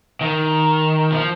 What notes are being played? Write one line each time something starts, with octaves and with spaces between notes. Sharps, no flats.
D#3
F3